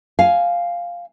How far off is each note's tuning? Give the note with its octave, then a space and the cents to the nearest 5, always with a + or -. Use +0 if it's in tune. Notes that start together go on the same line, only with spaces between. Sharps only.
F5 +0 G#5 +5